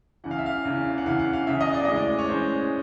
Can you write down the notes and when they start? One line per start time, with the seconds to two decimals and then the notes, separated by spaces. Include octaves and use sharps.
0.24 E2 C#3 E3 F#5
0.31 F5
0.38 E5
0.46 F5
0.65 E2 C#3 E3
0.98 F#5
1.06 E2 C#3 E3 F5
1.19 F#5
1.33 F5
1.47 E2 C#3 E3 E5
1.61 D#5
1.74 D5
1.85 A2 E3 G#3 C#4 D#5
1.96 D5
2.19 C#5
2.29 A2 E3 G#3 C#4 C5